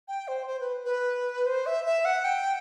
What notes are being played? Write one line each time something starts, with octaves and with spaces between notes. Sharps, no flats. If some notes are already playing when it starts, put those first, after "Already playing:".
G5
C5
C5
B4
B4
C5
E5
E5
F#5
G5